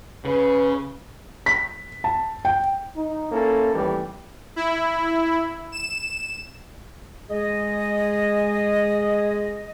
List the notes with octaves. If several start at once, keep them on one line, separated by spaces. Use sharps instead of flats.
C#3 B4
B6
A5
G5
D#4
A#3 C#4 E4 A4
A1 D#2 A2 E3 G3
E4
E7
G#3 G#4 D#5